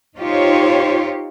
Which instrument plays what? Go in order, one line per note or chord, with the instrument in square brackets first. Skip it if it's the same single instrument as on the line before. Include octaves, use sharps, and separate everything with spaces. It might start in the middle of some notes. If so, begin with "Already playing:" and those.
[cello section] D#4 F4 G4 C5 C#5